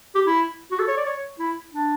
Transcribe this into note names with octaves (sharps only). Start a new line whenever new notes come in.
G4
E4
F#4
A4
C#5
D5
C#5
E4
D4